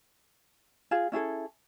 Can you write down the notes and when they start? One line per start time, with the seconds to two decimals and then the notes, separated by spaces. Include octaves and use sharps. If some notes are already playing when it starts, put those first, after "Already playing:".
0.91 F4 G#4
1.12 C#4 E4 G#4 A4